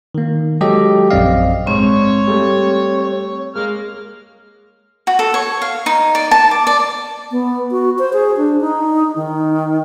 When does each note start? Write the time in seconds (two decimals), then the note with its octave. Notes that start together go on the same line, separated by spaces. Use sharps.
0.15 D#3 A#3
0.61 F#3 G#3 G4 A4 D#5
1.11 A#1 F#2 C4 D5 D#5 F5
1.67 G#2 C4 C#5 C#6
2.27 G3 A3
2.98 C#5
3.55 G#3 A#3 F6
5.07 F#4
5.19 A4
5.34 C#5
5.62 F5
5.86 D#4
6.15 D5
6.31 A5
6.51 D6
6.67 D5
7.31 B3
7.71 F#4
7.98 C5
8.13 G#4
8.37 D4
8.61 D#4
9.16 D#3